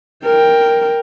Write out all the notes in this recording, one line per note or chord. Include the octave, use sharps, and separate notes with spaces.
A#4 G5